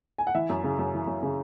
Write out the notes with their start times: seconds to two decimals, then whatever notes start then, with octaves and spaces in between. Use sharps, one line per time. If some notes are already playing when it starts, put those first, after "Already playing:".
0.18 G#5
0.27 F#5
0.35 E3 E5
0.50 F#2
0.64 C#3
0.79 F#2
0.94 E3
1.08 F#2
1.23 C#3